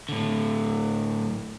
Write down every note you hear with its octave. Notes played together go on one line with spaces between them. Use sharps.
A2 D3